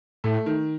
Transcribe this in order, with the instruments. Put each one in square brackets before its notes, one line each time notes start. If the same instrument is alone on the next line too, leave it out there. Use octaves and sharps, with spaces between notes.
[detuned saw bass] A2 [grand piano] A3
[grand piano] D#3